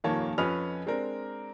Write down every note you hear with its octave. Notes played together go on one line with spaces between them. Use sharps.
D#1 F2 D#3 A#3 C#5 A5
F2 C#4 B4 D#5 F6 F7
G#3 C4 D4 A#4